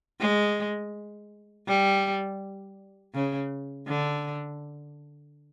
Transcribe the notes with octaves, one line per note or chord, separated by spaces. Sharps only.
G#3
G3
C#3
D3